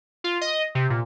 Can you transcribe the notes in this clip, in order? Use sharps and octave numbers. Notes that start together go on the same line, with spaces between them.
F4
D#5
C3
A#2